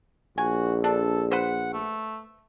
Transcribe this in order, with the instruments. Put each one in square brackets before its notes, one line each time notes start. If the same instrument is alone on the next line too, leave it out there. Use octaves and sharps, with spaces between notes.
[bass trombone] A#1 [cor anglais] F#4 [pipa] G#5
[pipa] D4 [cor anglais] A4
[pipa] B4 C5 [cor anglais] F#5
[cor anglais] A3